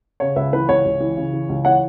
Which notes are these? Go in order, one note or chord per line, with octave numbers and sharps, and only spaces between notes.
C#3 C#5
C#2 B4 E5
E3 B4
C#2 C#5
C#2
E3
C#3
E3
C#2
E3 C#5 F#5